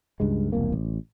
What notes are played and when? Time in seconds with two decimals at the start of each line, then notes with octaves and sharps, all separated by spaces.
0.20 C#2 G2 G#3
0.52 E1 C2 A#3
0.72 A1